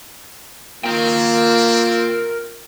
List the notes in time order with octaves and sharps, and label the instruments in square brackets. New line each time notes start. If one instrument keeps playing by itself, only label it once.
[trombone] A#3 [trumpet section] C4 [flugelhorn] F4 [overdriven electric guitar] A#4 G5